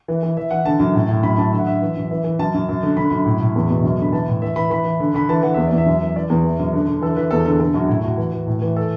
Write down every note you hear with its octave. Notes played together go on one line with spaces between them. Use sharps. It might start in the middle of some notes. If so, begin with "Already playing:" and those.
E3
E3
E3 E5
E3 F#5
D3 A5
F#2
A2
A2
F#2 B5
F#2 A5
D3 E5
F#5
D3 E5
E3
F#2
E3
E3
F#2 A5
F#2
F#2
D3
D3 B5
F#2
A2
A2
E2
B2
F#2
D3 B5
E3 A5
A2
E3 E5
E3 B5
E3 B5
E3
D3
D3 B5
E3 A5
E3 F#5
E2 E5
E2 D5
E5
F#2
E3
E3 D5
E2
E3
F#2
D3
D3
E3 A4
E3 B4
E2 A4
D3 A4
D3 A4
F#2 F#4
A2 E4
A2 F#4
E3
E3
A2
E3
A4